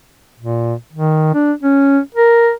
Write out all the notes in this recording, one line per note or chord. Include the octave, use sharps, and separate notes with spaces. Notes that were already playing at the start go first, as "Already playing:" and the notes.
A#2
D#3
D4
C#4
A#4